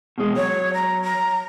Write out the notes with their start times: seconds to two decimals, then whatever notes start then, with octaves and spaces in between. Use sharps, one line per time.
0.18 B2 G#3
0.36 F#3 C#5
0.74 A#5
1.04 A#5